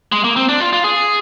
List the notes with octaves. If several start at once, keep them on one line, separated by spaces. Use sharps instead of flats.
G#3
A#3
C4
D4
F4
F4
G#4